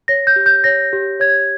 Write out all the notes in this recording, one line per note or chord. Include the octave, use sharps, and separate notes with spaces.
C#5 A#6
G6
G4
G6
C#5 A#6
G4
C#5 G#6